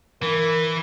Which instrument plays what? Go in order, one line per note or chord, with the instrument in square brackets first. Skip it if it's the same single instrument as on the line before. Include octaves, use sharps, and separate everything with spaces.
[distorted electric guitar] E3 [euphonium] A#4